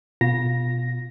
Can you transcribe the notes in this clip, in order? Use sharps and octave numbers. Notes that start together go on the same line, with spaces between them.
B2 F4 A#6